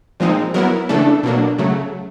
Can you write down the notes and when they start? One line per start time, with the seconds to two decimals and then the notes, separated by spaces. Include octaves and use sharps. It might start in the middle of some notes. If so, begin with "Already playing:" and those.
0.20 A#2 F3 G#3 C4 D#4
0.54 F#3 B3 E4 A#4
0.89 C#3 E3 A3 D4 A4
1.23 B2 F#3 A#3 D4
1.58 C#3 F#3 A3